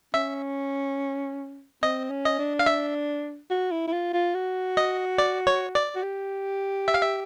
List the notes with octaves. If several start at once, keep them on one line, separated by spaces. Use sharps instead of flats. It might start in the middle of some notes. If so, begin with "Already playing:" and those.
C#4 E5
C4 D#5
C#4
D#5
D4
F5
E5
F#4
E4
E4
F4
F4
F#4
D#5
D5
C#5
D5
F#4
G4
E5
F5
E5